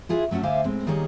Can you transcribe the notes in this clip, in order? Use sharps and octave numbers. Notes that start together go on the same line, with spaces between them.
E4 F4 G#4 B4
F#3 A3 C4 C#4 F#4
D2 C5 D5 E5 F5 G#5
A2 G#3 C4
D#3 G3 A#3 D#4 G#4 C#5